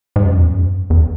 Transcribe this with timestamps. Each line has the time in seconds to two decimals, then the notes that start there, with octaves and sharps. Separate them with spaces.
0.16 G#2
0.25 F#2
0.37 E2
0.47 F#2
0.90 E2